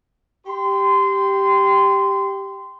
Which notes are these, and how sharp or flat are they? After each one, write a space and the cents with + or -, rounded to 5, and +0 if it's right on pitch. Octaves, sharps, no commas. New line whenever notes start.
G4 +0 C6 -25